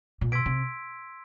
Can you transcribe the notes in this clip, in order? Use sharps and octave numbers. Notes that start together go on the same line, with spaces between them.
A#2
B2 C6 E6 G#6 B6 D7
C3